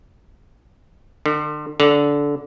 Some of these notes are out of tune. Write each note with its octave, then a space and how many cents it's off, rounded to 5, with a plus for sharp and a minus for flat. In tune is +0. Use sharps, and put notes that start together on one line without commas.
D3 +40
D3 -15